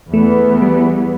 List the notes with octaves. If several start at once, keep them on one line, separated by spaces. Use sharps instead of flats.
E2 E3 A3 B3
G3